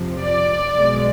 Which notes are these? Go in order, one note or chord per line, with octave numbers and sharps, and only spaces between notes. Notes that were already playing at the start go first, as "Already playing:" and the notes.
Already playing: F2 C3 F3
D5
B1 B2 G#3